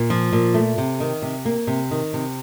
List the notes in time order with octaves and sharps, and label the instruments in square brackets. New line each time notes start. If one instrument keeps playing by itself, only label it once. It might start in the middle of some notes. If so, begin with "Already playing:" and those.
Already playing: [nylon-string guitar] A#2
F3
A#2
A3
C3
D#3
C3
A#3
C3
D#3
C3